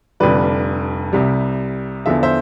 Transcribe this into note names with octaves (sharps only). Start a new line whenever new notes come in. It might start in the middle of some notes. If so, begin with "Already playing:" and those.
F1 F2 D3 G3 B4 D5
C2 C3 G3
E2 D3 F3 E5
C5 E5